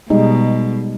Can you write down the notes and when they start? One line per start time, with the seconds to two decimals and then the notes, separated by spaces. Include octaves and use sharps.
0.10 B2 G3 G#3 D#4